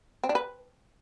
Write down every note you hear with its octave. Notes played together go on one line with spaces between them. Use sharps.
C4
D4
B4